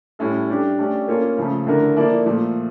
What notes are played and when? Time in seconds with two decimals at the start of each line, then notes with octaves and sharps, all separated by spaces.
0.19 A2 G3 C#4 E4 A4
0.48 G3 D4 G4
0.79 A3 C#4 G4 D5
1.08 A#3 C#4 F4 C#5
1.37 C#3 F3 A3
1.67 D3 A3 E4 A#4
1.96 F3 A#3 E4 A4 D5
2.26 A#2 F3 A3